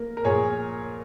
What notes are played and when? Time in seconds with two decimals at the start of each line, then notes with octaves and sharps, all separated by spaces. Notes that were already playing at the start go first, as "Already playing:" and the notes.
Already playing: A#3 A#4
0.17 A#4
0.24 A#2 G#4 C#5